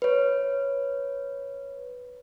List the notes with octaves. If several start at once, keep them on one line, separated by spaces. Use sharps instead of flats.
B4 C#5